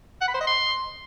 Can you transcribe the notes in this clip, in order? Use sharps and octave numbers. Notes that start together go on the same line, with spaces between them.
F#5
B5
C5
D#5
C6